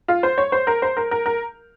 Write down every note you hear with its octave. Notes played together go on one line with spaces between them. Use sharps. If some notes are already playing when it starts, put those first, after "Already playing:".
F4
C5
C#5
C5
A#4
C5
A#4
A#4
A#4